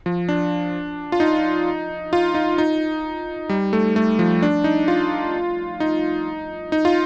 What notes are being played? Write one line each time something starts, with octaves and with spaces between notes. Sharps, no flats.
F3
D4
F4
D#4
F4
D#4
D#4
G3
A3
A3
F3
D4
D#4
F4
D#4
D#4
F4